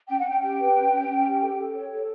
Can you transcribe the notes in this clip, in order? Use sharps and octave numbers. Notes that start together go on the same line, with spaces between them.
C#4 G5
F#5
C#4 G5
G4 G5
B4
C#4
C#4
C#4
G4
A4
A4
C#5
A4